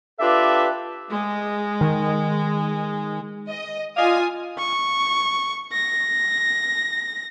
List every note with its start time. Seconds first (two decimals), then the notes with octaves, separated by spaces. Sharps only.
0.20 D4 F4 G4 A4 B4 E5
1.11 G#3
1.81 D#3
3.48 D#5
3.97 F4 D5 D#5 F5 G#5 D#6
4.58 C#6
5.72 A#6